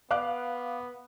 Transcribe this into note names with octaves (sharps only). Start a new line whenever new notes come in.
B3 F5 D6 F#6